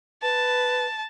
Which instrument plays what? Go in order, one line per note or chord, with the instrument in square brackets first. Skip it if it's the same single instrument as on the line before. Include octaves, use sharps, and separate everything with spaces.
[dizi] B4 [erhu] A5